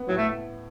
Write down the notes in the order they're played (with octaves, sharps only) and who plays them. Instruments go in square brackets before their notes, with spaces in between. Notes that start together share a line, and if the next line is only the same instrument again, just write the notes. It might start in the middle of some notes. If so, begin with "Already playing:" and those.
Already playing: [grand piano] B3
[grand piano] A2 [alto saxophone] F#3
[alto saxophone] A3